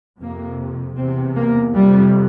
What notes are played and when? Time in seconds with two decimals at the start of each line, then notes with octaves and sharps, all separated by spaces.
0.19 F2 C3 A#3
0.97 E2 C3 C4
1.36 A#3
1.74 F2 C3 G3